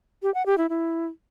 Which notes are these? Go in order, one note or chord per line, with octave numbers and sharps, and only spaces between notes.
G4
F#5
G4
E4
E4